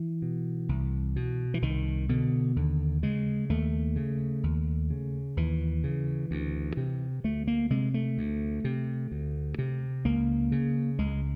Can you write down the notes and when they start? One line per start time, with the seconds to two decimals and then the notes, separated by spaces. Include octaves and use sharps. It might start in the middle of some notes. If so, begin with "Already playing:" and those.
Already playing: E3
0.22 B2
0.69 C2
1.16 B2
1.54 E3
1.62 C2 D#3
2.09 B2 D3
2.56 D#2 D3
3.03 C#3 G#3
3.50 D#2 A3
3.96 C#3
4.43 D#2
4.90 C#3
5.37 D#2 E3
5.84 C#3
6.31 D2
6.77 C3
7.24 D2 A3
7.47 A#3
7.70 C3 G#3
7.94 A3
8.18 D2
8.64 C3
9.12 D2
9.59 C3
10.05 C#2 A#3
10.52 C#3
10.99 C#2 G#3